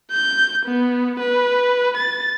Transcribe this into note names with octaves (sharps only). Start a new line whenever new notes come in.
G6
B3
B4
A6